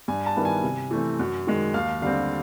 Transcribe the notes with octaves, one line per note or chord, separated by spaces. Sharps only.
G2 G#5
A5
D#3 G3 B3 E4
G#5
C3
E3 A3 C4
F#2
D#3 G#3
D#2 F5
D3 G3 C4 F5